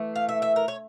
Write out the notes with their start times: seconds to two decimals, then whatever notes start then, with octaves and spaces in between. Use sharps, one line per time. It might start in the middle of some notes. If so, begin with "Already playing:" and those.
Already playing: E3 A3
0.16 F5
0.29 E5
0.42 E5
0.56 A#4
0.68 C#5